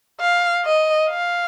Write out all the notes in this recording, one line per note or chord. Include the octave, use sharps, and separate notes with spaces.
F5
D#5
F5